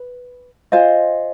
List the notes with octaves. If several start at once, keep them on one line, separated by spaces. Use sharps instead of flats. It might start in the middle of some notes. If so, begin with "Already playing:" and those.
Already playing: B4
F4 C5 D#5 G#5